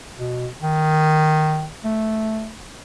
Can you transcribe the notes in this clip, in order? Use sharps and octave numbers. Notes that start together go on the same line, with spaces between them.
B2
D#3
A3